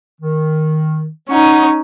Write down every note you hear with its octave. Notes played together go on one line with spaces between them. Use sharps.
D#3
C#4 D#4 F#5 C#6